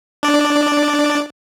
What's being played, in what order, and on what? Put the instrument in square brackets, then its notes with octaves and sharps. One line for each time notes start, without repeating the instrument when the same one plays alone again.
[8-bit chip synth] D4 D5